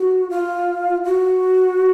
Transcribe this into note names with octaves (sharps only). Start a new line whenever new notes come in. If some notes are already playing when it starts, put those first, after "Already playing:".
Already playing: F#4
F4
F#4